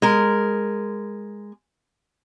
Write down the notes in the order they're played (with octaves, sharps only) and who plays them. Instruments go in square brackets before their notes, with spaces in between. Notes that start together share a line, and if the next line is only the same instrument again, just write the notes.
[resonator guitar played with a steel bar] G#3 A#4